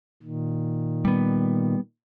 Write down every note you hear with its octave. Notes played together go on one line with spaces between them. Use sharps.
A#2 D#3
G3 B3